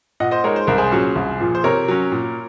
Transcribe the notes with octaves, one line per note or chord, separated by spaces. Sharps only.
A#2 D#5 F#5
C5 D#5
G#3 D#4 A#4 C#5
C5
C2 A#4
G#4 C5
A#2 F#3 C#4
C2
A#2 F3
C5
C3 A#4 C#5
F#3 C#4
A#2